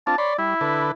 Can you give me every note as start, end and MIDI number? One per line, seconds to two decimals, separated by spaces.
0.07 0.16 60
0.07 0.16 62
0.07 0.16 65
0.07 0.18 81
0.18 0.34 73
0.18 0.36 74
0.18 0.34 83
0.18 0.34 84
0.38 0.54 55
0.38 0.91 64
0.61 0.92 50
0.61 0.92 69
0.61 0.92 71